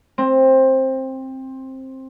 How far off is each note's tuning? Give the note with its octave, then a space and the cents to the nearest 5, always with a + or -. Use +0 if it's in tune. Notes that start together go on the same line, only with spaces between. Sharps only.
C4 +15